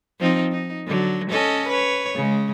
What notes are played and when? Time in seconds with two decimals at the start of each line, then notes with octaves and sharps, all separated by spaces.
0.20 F3 C4 D#4
0.52 D#4
0.87 D3 F#3
1.30 C#4 A4 D#5
1.69 B4 C#5
2.15 C#3 G#3